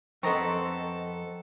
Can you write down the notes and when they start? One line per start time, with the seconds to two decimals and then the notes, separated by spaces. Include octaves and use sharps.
0.23 F2 B3 C4 A4 D#5 A#5 C#6